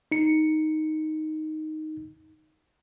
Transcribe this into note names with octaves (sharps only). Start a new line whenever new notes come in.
D#4 C#7